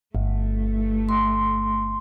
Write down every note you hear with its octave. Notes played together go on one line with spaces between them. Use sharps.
G1 A3
C6